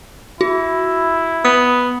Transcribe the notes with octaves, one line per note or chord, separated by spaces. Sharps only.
E4 F#4
B3 D#6